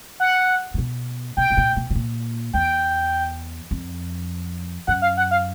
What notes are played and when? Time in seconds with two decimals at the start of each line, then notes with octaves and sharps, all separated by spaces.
0.20 F#5
0.74 C3
0.78 B2
1.37 B2 G5
1.50 B2
1.57 A#2
1.76 B2
1.90 B2
1.96 A#2
2.53 E2 G5
3.71 F2
4.87 F#2 F#5
5.02 F5
5.17 F#5
5.31 F5